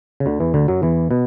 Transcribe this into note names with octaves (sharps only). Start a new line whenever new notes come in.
C#3
D2 D3
E2 E3
D2 D3
F#2 F#3
E2 E3
B2 B3